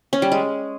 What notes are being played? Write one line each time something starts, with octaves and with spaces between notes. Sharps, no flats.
C#4
G3
G#3